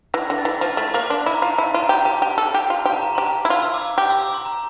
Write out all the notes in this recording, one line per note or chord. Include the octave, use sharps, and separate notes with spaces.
E3 A#6
D3
A6
E3
F3 A6
A3 A6
A#3 D6
D4 C6
E4 A5
A#5
F4
E4 A5
F4
A#5
G4
G4 A5
G4
A4
G4
F4
G4
A5
A#5
G4 C6
A#5
E4
F4
E6
D6
G4 D6
E6
D6
C6
A#5